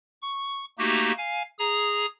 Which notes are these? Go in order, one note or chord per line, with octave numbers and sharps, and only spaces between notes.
C#6
A3 A#3 D#4 F#4 G4
F5 G#5
G#4 A#5 D#6